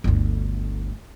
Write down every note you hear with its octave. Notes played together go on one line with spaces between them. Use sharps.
G1 D2